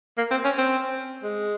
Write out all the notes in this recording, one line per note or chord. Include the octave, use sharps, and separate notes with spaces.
A#3
C4
C#4
C4
G#3